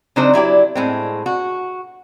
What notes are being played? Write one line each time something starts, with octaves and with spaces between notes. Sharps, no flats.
C#3 F#3 C4 D4 D#4 C5
F#3 E4 G4 D5
A2 G#3 C4
F#4